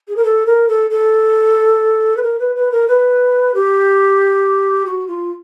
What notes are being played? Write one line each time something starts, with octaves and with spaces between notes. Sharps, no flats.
G#4
A#4
A4
A#4
A4
A4
B4
A#4
B4
B4
A#4
B4
G4
F#4
F4